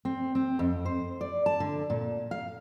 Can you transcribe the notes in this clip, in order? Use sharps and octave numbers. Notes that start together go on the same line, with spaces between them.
C4
C4
F2
C5
D5
A5
D3
A#2
F5